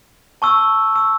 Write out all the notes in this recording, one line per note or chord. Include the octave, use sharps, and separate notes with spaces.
A5 C#6 E6
A5 C#6 E6